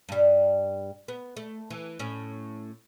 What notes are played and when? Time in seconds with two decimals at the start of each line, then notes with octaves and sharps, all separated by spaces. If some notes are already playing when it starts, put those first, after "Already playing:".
0.09 G2 G3
1.08 B3
1.37 A3
1.70 E3
1.99 A2 C#4